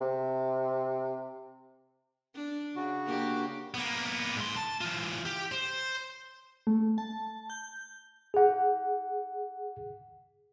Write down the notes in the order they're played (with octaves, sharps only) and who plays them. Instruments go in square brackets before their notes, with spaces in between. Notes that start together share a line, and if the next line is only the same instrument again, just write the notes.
[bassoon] C3
[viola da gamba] D4
[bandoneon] C#3 F#4
[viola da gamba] A#3 D4 G4
[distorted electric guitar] A#3 B3
G#2 C6
A5
E3 F4
G4
C5
[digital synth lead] A3
A5
G6
[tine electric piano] G#4 F#5